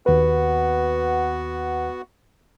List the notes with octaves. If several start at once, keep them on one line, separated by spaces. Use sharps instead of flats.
D#2 B3 F#4 B4